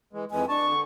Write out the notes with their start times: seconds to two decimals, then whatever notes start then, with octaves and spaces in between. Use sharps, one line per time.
0.13 E3 G#3
0.31 F2 E3 G#3 G#5
0.49 D4 A5 C#6
0.67 D3